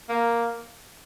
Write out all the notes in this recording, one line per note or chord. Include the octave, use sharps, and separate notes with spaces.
A#3